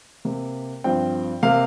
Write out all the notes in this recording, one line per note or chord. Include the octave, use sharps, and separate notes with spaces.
C3 A#3
G2 F3 C4 G5
C3 A#3 F5